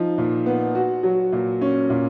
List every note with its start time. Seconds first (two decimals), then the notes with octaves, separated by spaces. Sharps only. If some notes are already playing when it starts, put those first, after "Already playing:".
Already playing: F3 D#4
0.18 A#2
0.46 B3
0.75 F#4
1.03 F#3
1.32 A#2
1.61 C#4
1.90 A#2